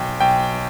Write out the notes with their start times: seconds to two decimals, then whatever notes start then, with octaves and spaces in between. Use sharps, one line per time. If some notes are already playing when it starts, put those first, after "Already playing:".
Already playing: B1 G5
0.20 B1 G5